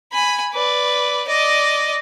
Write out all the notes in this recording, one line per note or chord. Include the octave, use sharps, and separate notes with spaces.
G#5 B5
B4 D5
D5 D#5